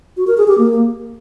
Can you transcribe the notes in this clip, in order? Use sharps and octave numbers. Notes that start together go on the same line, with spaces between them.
F#4
A#4
G#4
G4
A#3